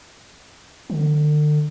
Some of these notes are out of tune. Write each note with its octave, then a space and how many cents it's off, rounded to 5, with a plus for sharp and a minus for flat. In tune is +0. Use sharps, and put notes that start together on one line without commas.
D3 +35